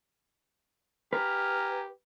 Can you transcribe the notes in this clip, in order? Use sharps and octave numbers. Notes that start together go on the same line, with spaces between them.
G4 B4 G#5 A#5 F6